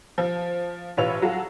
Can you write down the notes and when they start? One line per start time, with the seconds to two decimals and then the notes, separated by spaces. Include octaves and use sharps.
0.18 F3
0.97 A1 F4 B4 C#5 E6 F7
1.22 F#3 F4 F#4 A4